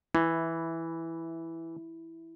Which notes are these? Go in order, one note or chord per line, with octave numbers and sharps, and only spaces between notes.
E3 E4